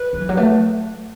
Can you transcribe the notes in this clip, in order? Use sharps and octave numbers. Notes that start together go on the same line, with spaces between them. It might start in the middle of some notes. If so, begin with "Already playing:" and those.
Already playing: B4
F#3
E3
F#3
A3